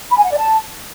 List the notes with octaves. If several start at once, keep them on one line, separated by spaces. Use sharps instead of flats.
B5
G#5
F#5
D5
A5